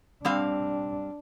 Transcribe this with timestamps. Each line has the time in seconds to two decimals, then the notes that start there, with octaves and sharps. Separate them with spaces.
0.25 G3 C4 D4 F5